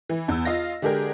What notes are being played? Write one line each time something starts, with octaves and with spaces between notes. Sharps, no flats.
E3
E2 E6
F4 D#5 F5 A#6
D3 G#3 G4 G#4 A#4